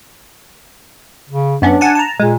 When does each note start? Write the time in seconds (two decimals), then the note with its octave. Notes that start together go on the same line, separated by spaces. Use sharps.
1.29 C#3
1.62 F#2 B3 C#4 D4
1.81 F#5 G#5 A5
1.95 A5 A#5
2.20 A#2 G#3